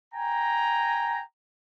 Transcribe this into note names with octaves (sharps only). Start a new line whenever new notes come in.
G5 G#5 A#5